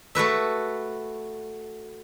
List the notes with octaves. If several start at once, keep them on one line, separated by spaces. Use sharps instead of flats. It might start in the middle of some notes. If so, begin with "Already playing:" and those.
A3 F#4 B4 E5